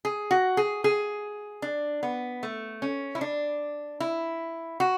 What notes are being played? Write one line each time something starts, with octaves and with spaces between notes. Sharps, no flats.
G#4
F#4
G#4
G#4
D4
B3
A3
C#4
E4
D4
E4
F#4